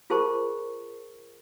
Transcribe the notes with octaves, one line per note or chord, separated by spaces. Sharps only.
F4 G#4 A#4 C5 A5 C#6